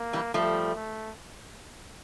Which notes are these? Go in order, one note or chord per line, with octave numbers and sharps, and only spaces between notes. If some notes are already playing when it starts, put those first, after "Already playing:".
Already playing: A#3
E3 G3
F3 G3 A3
A3